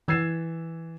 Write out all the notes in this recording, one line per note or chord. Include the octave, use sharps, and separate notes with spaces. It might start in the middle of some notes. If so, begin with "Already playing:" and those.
E3 E6 G#6 A6 C7 E7